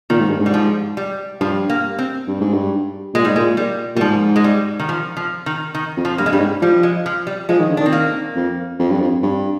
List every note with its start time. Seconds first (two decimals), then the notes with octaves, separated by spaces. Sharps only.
0.10 A#2 D#3
0.20 G#2
0.30 G2
0.40 G#2
0.46 G3
0.54 F3
0.97 G3
1.40 G2 F3
1.70 A#3
1.99 C4
2.27 G2
2.41 G#2
2.54 G2
3.14 A#2 G#3
3.25 G#2 G3
3.36 A#2 G#3
3.57 G3
3.96 A#2 G3
4.01 G#2 F3
4.36 G#3
4.44 G3
4.80 D#3
4.89 F3
5.17 F3
5.46 D#3
5.75 D#3
5.97 F2
6.05 F3
6.18 G2 A#3
6.26 G#3
6.32 G2 G3
6.40 G#2
6.62 F3 G3
6.83 G#3
7.06 F3
7.27 G3
7.49 F3 G#3
7.60 D#3
7.70 D3
7.77 D4
7.80 D#3
7.86 C4
7.93 A#3
8.36 F2
8.79 F2
8.91 G2
9.01 F2
9.23 G2